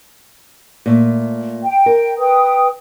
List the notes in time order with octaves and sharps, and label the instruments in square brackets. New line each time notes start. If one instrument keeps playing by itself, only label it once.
[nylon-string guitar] A#2 A3
[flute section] G5
[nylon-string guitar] A#4
[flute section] B4 G5 D#6